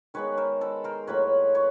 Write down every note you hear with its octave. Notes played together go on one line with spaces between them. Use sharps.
D#3 G#3 B3 B4 C#5
A#4 C5
A4 B4
A#4 C5
A2 F#3 A#3 B4 C#5
B4 C#5